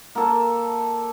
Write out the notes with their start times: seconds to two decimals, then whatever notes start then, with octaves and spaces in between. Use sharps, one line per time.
0.15 A#3 A4